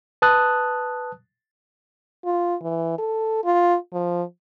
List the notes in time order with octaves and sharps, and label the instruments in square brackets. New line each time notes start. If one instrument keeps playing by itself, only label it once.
[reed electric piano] B4 A5 D#6 F#6
[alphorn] F4
E3
A4
F4
F3